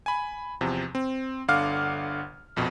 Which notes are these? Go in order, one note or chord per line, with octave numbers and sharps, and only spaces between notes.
G#5 B5
E2 C3 F3
C4
G1 D3 F5 F#5 D6 F6
A#1 F2 B2